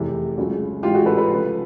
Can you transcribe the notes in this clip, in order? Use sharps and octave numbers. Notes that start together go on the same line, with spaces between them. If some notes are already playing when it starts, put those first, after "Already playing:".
Already playing: F1 E2 C3 E3
C#2 C#3 F#3
A1 G#2 E3 F4 G4
F#4 G#4
A4 B4
A4 B4
C#2 C3 F3